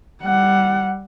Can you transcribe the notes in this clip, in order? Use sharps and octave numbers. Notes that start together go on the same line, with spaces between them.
G3 F#5